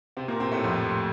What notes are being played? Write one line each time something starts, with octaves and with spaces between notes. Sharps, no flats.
C3 C4
A#2 A#3
C3 C4
A2 A3
F2 F3